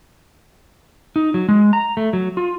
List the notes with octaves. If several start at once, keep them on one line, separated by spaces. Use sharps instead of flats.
D#4
F#3
G#3
A#5
A3
F#3
F4